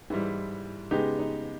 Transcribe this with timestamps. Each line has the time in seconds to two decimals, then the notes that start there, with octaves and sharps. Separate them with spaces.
0.10 G#2 E3 G3 E4
0.91 C#3 G#3 B3 D#4 G4
1.19 D#4